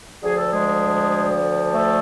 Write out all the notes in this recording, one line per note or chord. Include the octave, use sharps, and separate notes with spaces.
D2 D3 F3 G#4
A4
G#3 G#4
A3 A4